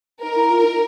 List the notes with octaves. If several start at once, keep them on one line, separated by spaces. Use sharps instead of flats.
D#4 A#4
E4
F4
D#4